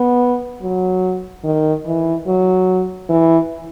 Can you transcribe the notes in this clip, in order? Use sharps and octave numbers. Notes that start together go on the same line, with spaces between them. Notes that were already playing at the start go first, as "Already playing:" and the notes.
Already playing: B3
F#3
D#3
E3
F#3
E3